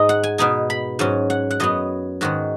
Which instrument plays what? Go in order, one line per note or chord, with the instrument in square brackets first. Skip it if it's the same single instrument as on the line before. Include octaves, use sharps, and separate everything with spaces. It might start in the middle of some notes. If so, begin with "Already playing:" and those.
Already playing: [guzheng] G#2 G#3 D#4 D#5
F#5
G#5
B2 B3 D#4 G#5
B5
G#2 F#3 C#4 G#5
F#5
F#5
F#2 F#3 B3 D#5
G#2 D#3 G#3 F#4